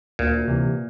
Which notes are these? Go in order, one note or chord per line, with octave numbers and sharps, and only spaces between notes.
D2 A#2
C3 E3